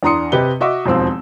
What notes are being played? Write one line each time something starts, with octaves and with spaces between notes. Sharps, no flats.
E2 D4 A#5 C6 D#6 C#7
C3 G4 B4 D#5 G7
F#4 D#5 E5 C#6 D6
E1 D#2 F3 C4 C6 E6